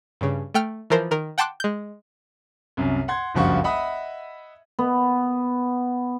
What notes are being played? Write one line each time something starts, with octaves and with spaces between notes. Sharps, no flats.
G2 C#3
A3 G5 F6
E3 F3 A#4 C5
D#3 A#4
F#5 G5 A5 C6 D6 F#6
G#3 G6
C2 F#2
F#5 C6 G#6
F#1 C#2 G2 F3 F#4 C#6
D#5 E5 F#5 B5 D#6
B3